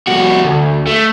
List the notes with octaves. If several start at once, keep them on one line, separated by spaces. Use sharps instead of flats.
C2 F#4
D2
A3